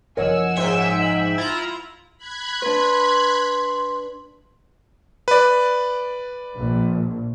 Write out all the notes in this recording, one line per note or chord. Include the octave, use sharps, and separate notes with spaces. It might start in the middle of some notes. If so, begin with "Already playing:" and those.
F#1 F3 A#4 C#5 D#5 F#5 G#5 E6
G#2 E5 G5
F#7
E4 F4 A#5
B5 F#6 G#6
D4 B4 C6
B4 D5
A#1